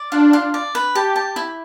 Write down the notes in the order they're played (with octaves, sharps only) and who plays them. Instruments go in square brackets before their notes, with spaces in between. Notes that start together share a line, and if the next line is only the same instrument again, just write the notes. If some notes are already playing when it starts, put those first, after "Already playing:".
Already playing: [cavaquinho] D5
[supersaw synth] D4 [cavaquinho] F4
[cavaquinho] F4
D5
B4
[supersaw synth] G4 [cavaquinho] A5
[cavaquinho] A5
E4